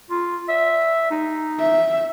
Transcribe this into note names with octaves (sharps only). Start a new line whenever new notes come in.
F4
E5
D#4
E5